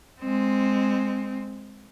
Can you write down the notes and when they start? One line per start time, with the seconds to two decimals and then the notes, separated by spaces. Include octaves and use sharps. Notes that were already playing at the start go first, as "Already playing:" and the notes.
0.21 G#3 C4